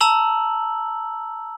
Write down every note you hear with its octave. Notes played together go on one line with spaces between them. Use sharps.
A5 A#5 E6 F#7